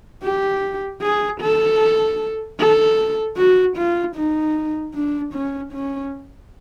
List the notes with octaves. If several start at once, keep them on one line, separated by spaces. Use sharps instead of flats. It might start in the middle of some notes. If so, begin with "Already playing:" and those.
G4
G#4
A4
A4
F#4
F4
D#4
D4
C#4
C#4